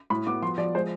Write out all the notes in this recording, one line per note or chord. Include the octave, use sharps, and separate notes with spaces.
A2 B5
B3 D6
F3 C6
F3 D5
G#3 C5